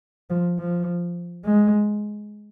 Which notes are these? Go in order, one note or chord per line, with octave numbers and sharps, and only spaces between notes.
F3
F3
G#3